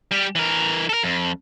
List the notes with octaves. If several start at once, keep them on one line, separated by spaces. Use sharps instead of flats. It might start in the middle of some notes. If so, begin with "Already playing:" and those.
G3 G4
E3 A#4
A4 A#4
F2